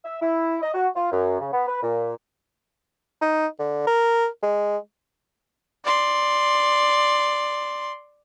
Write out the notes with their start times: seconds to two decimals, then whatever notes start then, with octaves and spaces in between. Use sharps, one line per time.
0.04 E5
0.21 E4
0.62 D#5
0.74 F#4
0.95 F4
1.11 F#2
1.40 C#3
1.52 B3
1.67 B4
1.82 A#2
3.22 D#4
3.59 D3
3.87 A#4
4.43 G#3
5.85 D5 C6